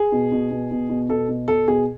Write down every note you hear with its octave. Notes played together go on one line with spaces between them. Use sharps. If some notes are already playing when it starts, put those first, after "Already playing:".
Already playing: G#4
B2
B2
B2
B2
B2
B2 A4
B2
B2 A4
B2 G#4